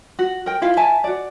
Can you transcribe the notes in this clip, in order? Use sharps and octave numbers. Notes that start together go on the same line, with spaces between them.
F#4
A#4 G5
E4 F4 F5
E5 G#5 A5
F#4 D5